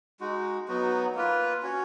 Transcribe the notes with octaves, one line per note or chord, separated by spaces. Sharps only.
G#3 D#4 F#4
F#3 B3 D#4 F#4
A#3 F4 B4
C#4 F#4 C#5